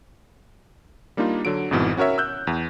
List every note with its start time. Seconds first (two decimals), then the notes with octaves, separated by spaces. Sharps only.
1.17 G3 A#3 D4 D#4 F4
1.45 D3 F#3 D7
1.71 G#1 F2 G#2 B2 E3
1.97 C#4 F#4 A#4 C#5 E5
2.18 E6 F#6 G6
2.47 E2